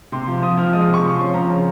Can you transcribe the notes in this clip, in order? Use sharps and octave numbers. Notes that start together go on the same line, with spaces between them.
C3 C6
F3
F3 D#6
F3 F6
G#3 D#6
C3
C#6
F3
C6
C#4
F3 A#5
C#3